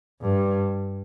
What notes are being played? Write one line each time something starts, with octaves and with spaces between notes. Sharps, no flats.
G2